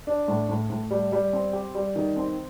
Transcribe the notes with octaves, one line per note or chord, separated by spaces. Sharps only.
D4
A2
A2
A2
G3
G3
C4
G4
G3
D#3
C4